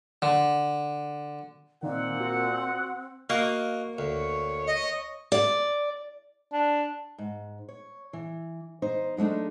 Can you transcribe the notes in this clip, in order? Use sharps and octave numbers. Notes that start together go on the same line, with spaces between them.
D3
A#2 D#3 C4 F#5
F#4
A#3 F#4 D#5 F5
D2 C#5
D#5
D5
D4
G#2
C#5
E3
D#4 C5
F#3 G#3 A3 D4 D#4